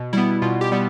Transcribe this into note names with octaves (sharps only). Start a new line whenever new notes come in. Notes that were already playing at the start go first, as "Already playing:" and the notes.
Already playing: B2
G3 B3 E4
B2 F4
G4
G3 B3